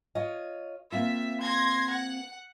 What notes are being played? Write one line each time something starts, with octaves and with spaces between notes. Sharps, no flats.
F4 C#5 D#5
A#3 C4 F4 E5
C6 G#6 A#6
F#5